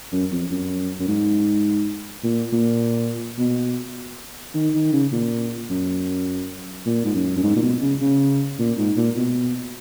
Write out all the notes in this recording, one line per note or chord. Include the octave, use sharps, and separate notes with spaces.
F#2
F2
F#2
F#2
G#2
A#2
A#2
B2
D#3
D#3
C#3
A#2
F#2
A#2
G#2
F#2
F#2
G#2
A#2
B2
C#3
C#3
A#2
G#2
A#2
B2